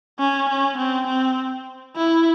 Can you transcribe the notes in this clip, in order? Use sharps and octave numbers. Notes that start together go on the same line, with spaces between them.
C#4
C#4
C4
C4
E4